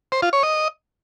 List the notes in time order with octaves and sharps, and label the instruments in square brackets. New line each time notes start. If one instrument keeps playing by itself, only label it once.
[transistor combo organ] C5
F4
C#5
D#5